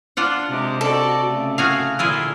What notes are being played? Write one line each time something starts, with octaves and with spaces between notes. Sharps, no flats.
D4 F4 F#5
C3 G#3 G4
F#4 A4 D5
C#3 A3
F#4 G#4 F5
A#2 D3 E4 F4 G#4